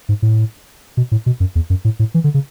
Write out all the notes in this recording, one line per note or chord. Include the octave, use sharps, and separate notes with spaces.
G#2
A2
B2
A2
B2
F#2
E2
F#2
A2
A2
E3
D3
C#3